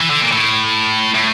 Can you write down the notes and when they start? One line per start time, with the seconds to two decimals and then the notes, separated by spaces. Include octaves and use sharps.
0.01 E3
0.10 D3
0.21 A#2
0.32 A2
1.14 A2